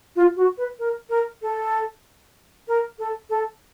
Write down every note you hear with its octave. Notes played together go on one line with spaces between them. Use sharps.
F4
F#4
B4
A#4
A#4
A4
A#4
A4
A4